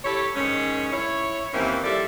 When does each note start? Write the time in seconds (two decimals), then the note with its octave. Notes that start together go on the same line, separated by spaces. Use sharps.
0.05 E4 G4 A4 C#5
0.35 G#2 D#3 C#4
0.92 E4 C#5
1.53 D#2 E3 A#3 C4 C#4
1.84 F3 G3 E4 A4 D5